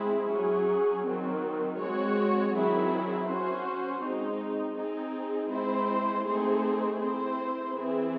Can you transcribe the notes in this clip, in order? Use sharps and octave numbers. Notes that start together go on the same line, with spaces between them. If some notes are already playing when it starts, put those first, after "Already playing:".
Already playing: G#3 C4 E4 G#4
F#3 C#4 G#4
D#3 F#3 C4
G#3 C4 F#4 C#5
D#3 F#3 C4 E4 G#4
C#4 F#4 C5
G#3 C4 D#4
C4 D#4 G#4
G#3 C4 E4 C5
A3 C4 D#4 G#4 C5
C4 E4 C5
E3 C4 E4 G#4